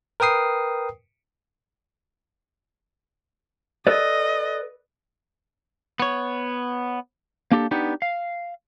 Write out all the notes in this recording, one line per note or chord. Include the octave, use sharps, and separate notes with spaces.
A#4 B4 G5 D#6 C7
A4 B4 D5 D#5
B3 C#5
A#3 D4 G4 A4
B3 D4 D#4 G4
F5